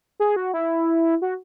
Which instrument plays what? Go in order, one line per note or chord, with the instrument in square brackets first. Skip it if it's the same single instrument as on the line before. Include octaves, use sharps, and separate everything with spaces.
[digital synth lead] G#4
F#4
E4
F#4